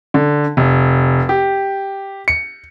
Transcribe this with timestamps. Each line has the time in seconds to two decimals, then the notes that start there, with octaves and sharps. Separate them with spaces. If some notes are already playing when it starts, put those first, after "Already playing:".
0.14 D3
0.57 F1
1.29 G4
2.28 C#7